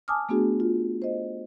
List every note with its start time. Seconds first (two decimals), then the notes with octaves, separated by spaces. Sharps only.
0.08 G#5 A5 D6 D#6 F6
0.29 A3 B3 D4 F#4 G#4
0.60 F4
1.02 C5 D#5